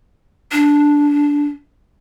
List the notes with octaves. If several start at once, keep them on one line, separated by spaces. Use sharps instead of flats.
D4